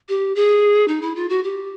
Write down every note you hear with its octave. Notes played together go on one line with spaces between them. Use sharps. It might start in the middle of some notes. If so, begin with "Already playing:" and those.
G4
G#4
D#4
E4
F4
F#4
G4